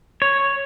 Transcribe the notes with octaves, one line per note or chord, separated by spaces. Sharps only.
C#5